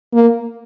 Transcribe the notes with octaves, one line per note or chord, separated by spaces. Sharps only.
A#3